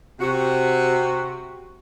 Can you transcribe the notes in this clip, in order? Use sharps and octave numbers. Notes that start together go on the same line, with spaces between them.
C3 F#4